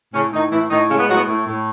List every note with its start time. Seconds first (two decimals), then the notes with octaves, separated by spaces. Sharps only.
0.14 A2 C#3 C#4
0.33 A2 D#3 D#4
0.51 A2 E3 E4
0.70 A2 D#3 D#4
0.89 C#3 G#3 C#4
0.99 B3
1.08 A2 F#3 F#4
1.17 B3
1.27 A2
1.47 A2